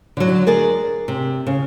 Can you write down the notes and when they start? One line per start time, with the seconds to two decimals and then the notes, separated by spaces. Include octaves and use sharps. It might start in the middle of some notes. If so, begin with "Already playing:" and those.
0.17 D3 F#3
0.47 G#4 A#4 D5 D#5
1.08 C3
1.47 C#3